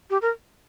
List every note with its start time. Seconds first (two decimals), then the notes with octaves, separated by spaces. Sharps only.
0.10 G4
0.22 A#4